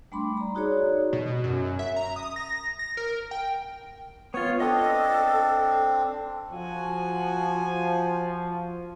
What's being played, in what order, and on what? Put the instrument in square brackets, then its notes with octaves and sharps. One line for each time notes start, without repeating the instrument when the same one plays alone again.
[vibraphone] G3 A3 D4 B5 C6 D6
D5 A#5
D#4 F#4 G#4 C#5 D5
[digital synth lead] B2
F#2
E5
A#5
D#6
A#6
A#6
A#4
G5
[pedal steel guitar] B3 F4 [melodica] C#5
[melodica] C4 D4 [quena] A4 [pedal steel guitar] D#5 D#6
[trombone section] F3 [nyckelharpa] F#4 G#5